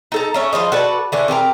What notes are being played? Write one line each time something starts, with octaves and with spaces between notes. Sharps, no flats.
D#4 A4 A#5
A3 C#4 E5
F3 G3 C5 D#5
F#4 A4 B4 D5
D3 E3 A3
C4 G4 G#4 A#4